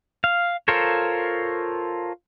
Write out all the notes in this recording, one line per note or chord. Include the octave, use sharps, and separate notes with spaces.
F5
F4 A4 A#4 C5 C#5